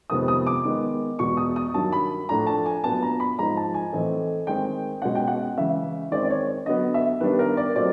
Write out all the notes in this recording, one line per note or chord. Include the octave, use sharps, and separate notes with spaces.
F2 C3 D#3 G#3 B3 D#6
D#6
D6
D#3 G#3 B3
E2 B2 G#3 C#6
D#6
D#6
G2 D#3 F#3 A5
B5
A2 F3 A3 D4 A#5
A5
G#5
A#2 F#3 B3 D4 A5
A#5
B5
G#2 F3 G#3 A#5
A5
G#5
A2 E3 A3 C4 D#4
D#3 G#3 C4 D#4 G5
B2 G#3 C#4 F#5
G5
F#5
C#3 E3 G#3 E5
D#3 G#3 C4 D5
D5
C#5
D3 F#3 B3 D#5
E5
D#3 G3 B3 D4 B4
A#4
D5
A#2 F#3 A3 C4 D#4 D5